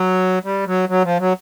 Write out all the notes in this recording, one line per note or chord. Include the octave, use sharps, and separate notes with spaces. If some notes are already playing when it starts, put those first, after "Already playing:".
Already playing: F#3
G3
F#3
F#3
F3
F#3